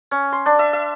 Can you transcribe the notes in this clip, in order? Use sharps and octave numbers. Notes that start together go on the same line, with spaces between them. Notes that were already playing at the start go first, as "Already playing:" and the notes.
C#4
C6
D4
E5
E5